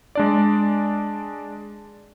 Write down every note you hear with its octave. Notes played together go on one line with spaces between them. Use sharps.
G#3 D4 D5